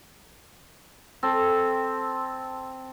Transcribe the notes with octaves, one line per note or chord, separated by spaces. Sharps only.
C4 A4